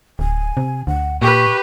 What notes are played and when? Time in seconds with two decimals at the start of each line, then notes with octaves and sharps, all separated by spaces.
0.19 D1 G#5
0.57 C3
0.87 D2 F#5
1.22 A#2 G4 B4 C#6